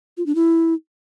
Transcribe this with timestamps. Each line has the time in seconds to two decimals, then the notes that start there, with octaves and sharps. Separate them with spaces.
0.17 F4
0.26 D4
0.35 E4